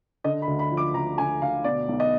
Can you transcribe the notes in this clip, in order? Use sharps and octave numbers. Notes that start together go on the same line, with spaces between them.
D3 D#5
B5
D2
B5
F3
D6
D2 A#5
D3 G#5
D2 F5
B2 D5
B1
D#5